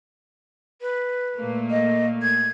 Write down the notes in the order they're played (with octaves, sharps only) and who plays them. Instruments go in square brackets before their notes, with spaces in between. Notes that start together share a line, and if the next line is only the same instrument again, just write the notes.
[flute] B4
[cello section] A#2 A3 A#3
[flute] D#5
G#6